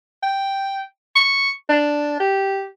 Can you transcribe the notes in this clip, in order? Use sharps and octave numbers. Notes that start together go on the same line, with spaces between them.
G5
C#6
D4
G4